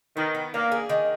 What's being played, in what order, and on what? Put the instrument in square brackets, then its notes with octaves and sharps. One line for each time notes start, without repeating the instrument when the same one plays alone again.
[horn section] D#3 [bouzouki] B3
[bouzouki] B3
[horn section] A#3 [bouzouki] D4
[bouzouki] G#4
D#3